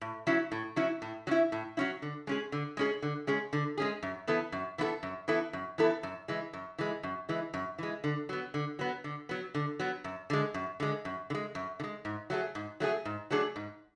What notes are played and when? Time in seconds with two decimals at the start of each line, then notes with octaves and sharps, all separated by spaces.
0.01 A2
0.27 F#3 C#4 E4
0.52 A2
0.76 F#3 C#4 E4
1.02 A2
1.27 F#3 C#4 E4
1.52 A2
1.77 F#3 C#4 E4
2.02 D3
2.27 G#3 C#4 G#4
2.52 D3
2.77 G#3 C#4 G#4
3.02 D3
3.27 G#3 C#4 G#4
3.53 D3
3.78 G#3 C#4 G#4
4.03 F#2
4.27 E3 B3 E4 A4
4.52 F#2
4.78 E3 B3 E4 A4
5.03 F#2
5.28 E3 B3 E4 A4
5.53 F#2
5.78 E3 B3 E4 A4
6.03 F#2
6.28 E3 G#3
6.53 F#2
6.78 E3 G#3
7.03 F#2
7.29 E3 G#3
7.54 F#2
7.78 E3 G#3
8.04 D3
8.29 F#3 B3
8.54 D3
8.79 F#3 B3
9.04 D3
9.29 F#3 B3
9.55 D3
9.80 F#3 B3
10.04 F#2
10.30 D3 G#3
10.54 F#2
10.80 D3 G#3
11.05 F#2
11.30 D3
11.34 G#3
11.55 F#2
11.80 D3
11.84 G#3
12.05 G#2
12.30 F#3 A3 D4 G#4
12.55 G#2
12.80 F#3 A3 D4 G#4
13.05 G#2
13.31 F#3 A3 D4 G#4
13.56 G#2